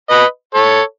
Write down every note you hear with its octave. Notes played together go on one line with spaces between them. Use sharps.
B4 D#5
A4 C#5